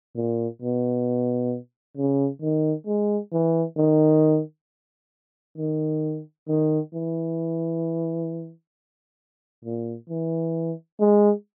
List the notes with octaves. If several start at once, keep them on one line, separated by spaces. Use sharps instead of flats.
A#2
B2
C#3
D#3
G#3
E3
D#3
D#3
D#3
E3
A#2
E3
G#3